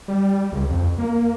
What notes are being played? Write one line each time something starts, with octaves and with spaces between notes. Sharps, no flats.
G3
C#2
F2
A#3